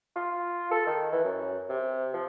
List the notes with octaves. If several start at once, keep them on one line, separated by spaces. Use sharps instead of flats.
F4
A4
D#3
E3
F#2
C3
F3